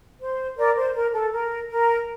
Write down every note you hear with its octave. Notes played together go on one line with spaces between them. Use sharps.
C5
A#4 D5
C5
A#4
A4
A#4
A#4